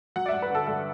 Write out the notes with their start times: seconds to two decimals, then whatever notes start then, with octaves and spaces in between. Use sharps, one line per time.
0.16 F#3 F#5
0.26 D5
0.29 G2 E5
0.42 B4
0.50 D3 A4
0.67 G2 A4